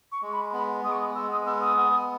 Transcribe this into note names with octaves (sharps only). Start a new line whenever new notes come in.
C#6
G#3
B5
B3 B5
G#3 D#6
C#6
D#6
G#3 E6
D#6
B3 E6
D#6
B3